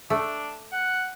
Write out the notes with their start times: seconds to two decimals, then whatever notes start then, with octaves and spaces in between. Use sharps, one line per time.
0.10 A3 D4
0.72 F#5